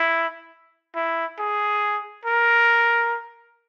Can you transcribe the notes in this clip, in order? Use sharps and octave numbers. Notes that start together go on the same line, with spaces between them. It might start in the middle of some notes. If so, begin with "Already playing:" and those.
Already playing: E4
E4
G#4
A#4